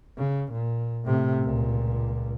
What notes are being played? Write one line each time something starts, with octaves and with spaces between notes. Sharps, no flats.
C#3
A#2
A2 C3
C#2 A#2